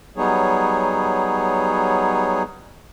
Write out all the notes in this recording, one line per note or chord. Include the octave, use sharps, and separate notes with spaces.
F#3 G3 B3 D#4 G#4 C#5